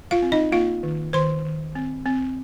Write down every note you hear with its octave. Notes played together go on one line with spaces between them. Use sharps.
F4 F5
C4
D#4 D#5
A#3 F4 F5
D#3
D#3 C5 C6
D#3
C4
C4